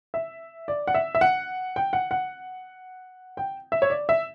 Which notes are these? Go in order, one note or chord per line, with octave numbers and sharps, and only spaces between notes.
E5
D5
F#5
E5
E5
F#5
G5
F#5
F#5
G5
E5
C#5
D5
E5